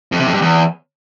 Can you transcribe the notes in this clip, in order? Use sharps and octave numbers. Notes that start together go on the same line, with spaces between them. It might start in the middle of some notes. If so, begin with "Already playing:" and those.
F2
C3
F2
G2
E2